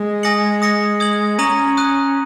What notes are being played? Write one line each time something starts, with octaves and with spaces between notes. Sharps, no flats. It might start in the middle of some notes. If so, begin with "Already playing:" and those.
Already playing: G#3
G#5 D#6 A#6 C#7 F#7
D#6 A#6 C#7
D#6 G#6 F#7
C#4 A#5 D#6 A#6 D#7 F#7
D#6 F#6 D#7